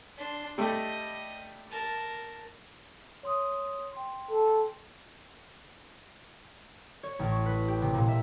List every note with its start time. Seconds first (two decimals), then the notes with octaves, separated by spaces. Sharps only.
0.17 D4 C6
0.58 G3 A3 D#5
1.70 A#4 A5
3.23 C#5 C6 D#6
3.92 G5 C6
4.30 A4
7.03 C#5
7.19 A1
7.31 C#6
7.46 B4
7.68 G4
7.82 C3
7.94 A#2
8.08 E5